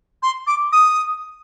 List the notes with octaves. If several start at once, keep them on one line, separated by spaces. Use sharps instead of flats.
C6
D6
D#6